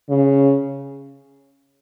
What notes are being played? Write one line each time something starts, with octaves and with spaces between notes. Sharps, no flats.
C#3